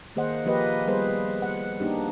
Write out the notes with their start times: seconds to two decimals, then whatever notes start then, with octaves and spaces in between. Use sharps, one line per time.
0.16 D#3 A#3 G#4 C5 D#5 F#5
0.45 F3 A#3 G4 B4 D#5
0.87 G3 B3 G#4 B4 C5
1.42 F#5
1.80 A#3 D4 D#4 G4